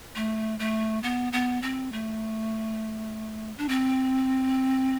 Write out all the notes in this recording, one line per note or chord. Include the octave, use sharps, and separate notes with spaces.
A3
A3
B3
B3
C4
A3
D4
C4